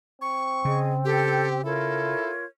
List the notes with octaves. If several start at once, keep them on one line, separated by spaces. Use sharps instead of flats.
C4 C#6
C#3 G#4 D#5
G4 A4 G6
E4 F4 A4 A#4 C#5